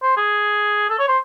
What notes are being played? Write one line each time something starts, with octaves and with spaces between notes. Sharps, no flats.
C5
G#4
A4
C#5
C5